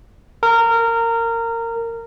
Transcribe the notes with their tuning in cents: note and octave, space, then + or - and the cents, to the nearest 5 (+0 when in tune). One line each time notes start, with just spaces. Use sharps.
A#4 -20